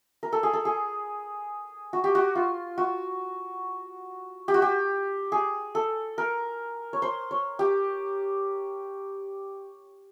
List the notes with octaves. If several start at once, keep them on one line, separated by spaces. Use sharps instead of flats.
A#4
A4
G#4
A4
G#4
F#4
G4
F#4
F4
F#4
G4
F#4
G4
G#4
A4
A#4
C#5
C5
C#5
G4